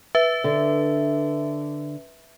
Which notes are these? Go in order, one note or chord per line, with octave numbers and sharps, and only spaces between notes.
B4 E5
D3 D4